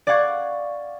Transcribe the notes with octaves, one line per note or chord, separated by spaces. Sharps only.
D5 F5 F#5 C#6 G#6 A6